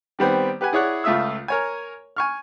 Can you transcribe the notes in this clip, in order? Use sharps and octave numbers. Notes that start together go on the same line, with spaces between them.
D#3 G3 B3 C4
G4 B4 F#5 G#5
E4 G#4 C#5 D5 F#5
C#2 A3 F4 E5 D#6 E6
A#4 C#5 G#5
G#5 C#6 F6